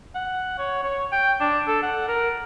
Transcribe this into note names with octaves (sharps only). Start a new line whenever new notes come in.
F#5
C#5
C#5
G5
D4
A4
F#5
A#4